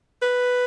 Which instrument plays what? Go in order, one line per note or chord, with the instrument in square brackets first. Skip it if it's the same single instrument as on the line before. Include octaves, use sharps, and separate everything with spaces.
[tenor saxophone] B4